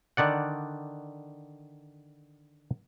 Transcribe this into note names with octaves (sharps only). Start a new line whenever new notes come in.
D3 D#3 D5 F#5